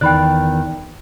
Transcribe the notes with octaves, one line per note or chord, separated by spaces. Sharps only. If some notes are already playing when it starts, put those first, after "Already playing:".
E2 D#3 D5 G5 B5 F#6